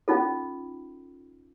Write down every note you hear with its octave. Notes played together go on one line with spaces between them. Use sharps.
C#4 D#4 F4 A4